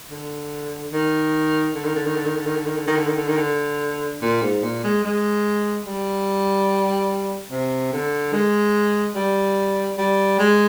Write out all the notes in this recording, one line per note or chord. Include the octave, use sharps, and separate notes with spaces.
D3
D#3
D3
D#3
D3
D#3
D3
D#3
D3
D#3
D3
D#3
D3
D#3
D3
D#3
D3
D#3
D3
A#2
G#2
A#2
G#3
G#3
G3
C3
D3
G#3
G3
G3
G#3